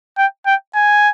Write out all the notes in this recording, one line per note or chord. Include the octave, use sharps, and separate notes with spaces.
G5
G5
G#5